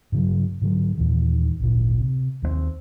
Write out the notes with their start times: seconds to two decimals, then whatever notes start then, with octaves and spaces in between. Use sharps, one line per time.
0.12 G2 C#3 F#3
0.61 G#2 D3 F#3
0.98 D#2 A#2 E3
1.60 G#1 D2 A#2
2.00 C3
2.42 D#2 E3 C4